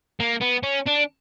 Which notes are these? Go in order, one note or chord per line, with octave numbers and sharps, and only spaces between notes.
A#3
B3
C#4
D4